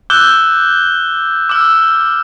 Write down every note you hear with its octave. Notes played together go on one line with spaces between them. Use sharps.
D6 E6 F#6 G6 G7
D6 E6 F6